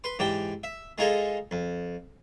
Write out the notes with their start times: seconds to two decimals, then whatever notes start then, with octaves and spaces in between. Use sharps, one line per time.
0.04 B4 C6
0.19 G#2 E3 G4 D5 G5
0.64 E5
0.98 G#3 D#4 F4 G#4 A4 D#5
1.51 F2